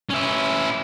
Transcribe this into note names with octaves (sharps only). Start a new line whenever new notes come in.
C#4 E4